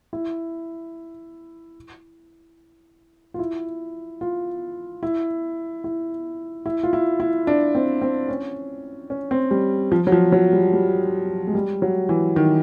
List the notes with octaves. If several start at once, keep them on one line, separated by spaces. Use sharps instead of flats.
E4
F4
E4
F4
E4
E4
E4
F4
E4
E4
D4
C4
C4
C#4
C#4
C4
G3
F3
F#3
F3
F#3
G3
G3
G#3
G3
F#3
E3
D#3